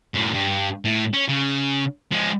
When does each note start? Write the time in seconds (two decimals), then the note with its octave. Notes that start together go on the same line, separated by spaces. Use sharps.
0.15 F#2 A2
0.34 G2
0.85 A2
1.14 C#4
1.29 C#3
2.12 F3 G#3